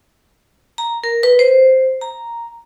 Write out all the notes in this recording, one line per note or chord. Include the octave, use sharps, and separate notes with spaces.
A#5
A#4
B4
C5
A#5